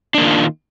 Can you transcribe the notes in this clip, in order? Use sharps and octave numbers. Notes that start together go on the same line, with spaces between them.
D#3 A#3 D4 F4